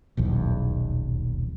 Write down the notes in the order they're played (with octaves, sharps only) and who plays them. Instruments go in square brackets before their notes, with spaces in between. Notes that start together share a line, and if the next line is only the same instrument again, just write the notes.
[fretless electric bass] D#1 B1 E2